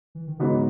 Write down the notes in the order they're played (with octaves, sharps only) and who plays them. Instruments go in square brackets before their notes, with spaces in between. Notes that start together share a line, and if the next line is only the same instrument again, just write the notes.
[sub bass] E3
D#3
[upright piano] G#2 F#3 B3 D#4 F#4 [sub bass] C#3